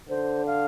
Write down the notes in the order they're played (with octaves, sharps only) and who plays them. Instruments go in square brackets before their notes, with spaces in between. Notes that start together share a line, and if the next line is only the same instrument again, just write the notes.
[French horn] D3 [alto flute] C5
[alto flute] F5